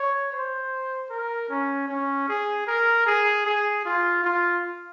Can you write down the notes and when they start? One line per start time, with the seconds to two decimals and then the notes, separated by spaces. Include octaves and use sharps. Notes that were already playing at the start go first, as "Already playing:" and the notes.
Already playing: C#5
0.32 C5
1.10 A#4
1.49 C#4
1.88 C#4
2.29 G#4
2.67 A#4
3.06 G#4
3.46 G#4
3.85 F4
4.24 F4